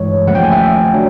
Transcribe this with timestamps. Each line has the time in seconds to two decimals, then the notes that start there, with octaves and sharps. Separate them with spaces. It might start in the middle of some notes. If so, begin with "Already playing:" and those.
Already playing: G2 E3 G#3 C#5
0.27 D#2 C#3 F3 A3 F#5
0.35 G5
0.44 G#5
0.52 E5
0.94 F#3 D4